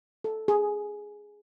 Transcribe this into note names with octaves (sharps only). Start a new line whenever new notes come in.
A4
G#4